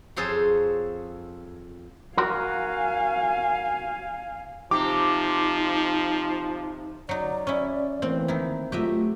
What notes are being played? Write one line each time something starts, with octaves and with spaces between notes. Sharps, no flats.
F2 G#4 A4 C5 C#5 C6
F#4 A#4 F5 G#5
C3 F3 D#4 G4 D6
F#3 D#4 D5
C#4 E4
D2 E3 A#3 C4
D#3 D#4 E4
F#3 A3 F4 G4 D#5 E5